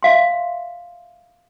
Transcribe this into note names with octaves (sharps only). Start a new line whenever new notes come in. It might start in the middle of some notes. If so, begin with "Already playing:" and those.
E5 F5 C6